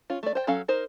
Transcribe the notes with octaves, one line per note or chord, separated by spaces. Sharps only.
C#4 F4
A3 D5
C5 G5
F#3 C#4 A4 F5
D#4 A#4 C5